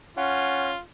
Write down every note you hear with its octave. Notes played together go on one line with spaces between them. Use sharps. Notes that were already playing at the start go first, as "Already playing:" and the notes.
C#4 F4 F#5